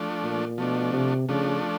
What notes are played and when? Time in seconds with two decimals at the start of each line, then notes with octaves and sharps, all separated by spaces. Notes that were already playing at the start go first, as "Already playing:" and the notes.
Already playing: F3 A3 D4
0.24 A#2
0.58 B2 F3 A3 D4
0.93 C3
1.29 C#3 F3 A3 D4